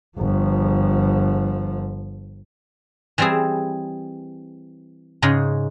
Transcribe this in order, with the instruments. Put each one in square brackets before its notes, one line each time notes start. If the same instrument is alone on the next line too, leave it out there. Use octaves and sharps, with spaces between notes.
[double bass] G1 F3
[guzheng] E3 G3 C4 E4 G#4
G#2 C#3 G#3 D#4